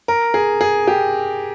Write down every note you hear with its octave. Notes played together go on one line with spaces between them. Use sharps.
A#4
G#4
G#4
G4